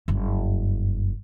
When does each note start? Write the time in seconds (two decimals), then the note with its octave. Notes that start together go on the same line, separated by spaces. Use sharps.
0.08 F#1 G2